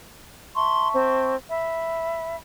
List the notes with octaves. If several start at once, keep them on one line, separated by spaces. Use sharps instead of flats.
E5 A5 C6 C#6
C4
E5 B5